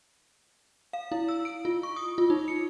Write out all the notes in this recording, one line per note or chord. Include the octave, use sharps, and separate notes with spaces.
F5
E4
E6
D7
F4
C#6
D#6
F4
D#4
C#7